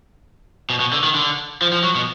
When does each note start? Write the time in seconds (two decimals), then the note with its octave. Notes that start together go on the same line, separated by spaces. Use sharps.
0.70 B2
0.80 B2
0.92 D3
1.04 D#3
1.15 D3
1.62 F3
1.73 F3
1.84 F#3
1.95 B2